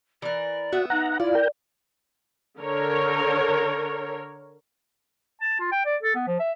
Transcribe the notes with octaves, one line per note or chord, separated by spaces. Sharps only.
E3 A#4 D5
B3 F#4 E5
D#4 F#5 A#5
E4 F4 D5
A#4 G5
D3 A#4 C#5
A5
F4
G5
D5
A4
B3
F3
E5